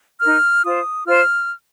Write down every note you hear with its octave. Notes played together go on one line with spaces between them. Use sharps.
D#4 A#4 F6
F4 C5 D#6
F4 C5 F6